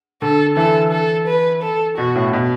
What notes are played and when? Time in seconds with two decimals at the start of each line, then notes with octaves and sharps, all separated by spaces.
0.22 D3 A4
0.57 E3 A4
0.92 A4
1.27 B4
1.62 A4
1.97 B2 F#4
2.15 A2
2.33 B2